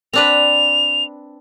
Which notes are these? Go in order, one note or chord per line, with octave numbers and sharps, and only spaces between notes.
C4 D4 B4 F7